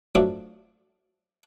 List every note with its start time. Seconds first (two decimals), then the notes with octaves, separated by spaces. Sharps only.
0.15 F#3 A3 C4 D4 F4